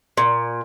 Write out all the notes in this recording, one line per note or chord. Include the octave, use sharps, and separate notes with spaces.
A#2